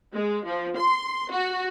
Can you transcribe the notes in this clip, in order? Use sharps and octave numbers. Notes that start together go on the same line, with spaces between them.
G#3
F3
C6
F#4